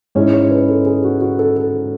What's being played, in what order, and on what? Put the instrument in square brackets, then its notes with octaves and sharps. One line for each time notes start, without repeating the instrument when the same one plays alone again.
[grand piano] G#2 G#3 C#4 E4 C#5
C#5
B4
A4
G#4
F#4
F#4
A4
A4